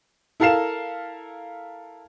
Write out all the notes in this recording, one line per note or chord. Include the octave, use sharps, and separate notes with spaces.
E4 A4 A#4 F5 C7 E7